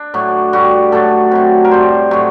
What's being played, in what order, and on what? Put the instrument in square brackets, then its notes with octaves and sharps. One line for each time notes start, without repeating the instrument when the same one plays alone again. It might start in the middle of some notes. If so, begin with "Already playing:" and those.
Already playing: [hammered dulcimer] D4
A2 F#3
A2 G3 F#4
A2 F#3 A4
C3 F#3
A#4
A2 G3 C5
A2 F#3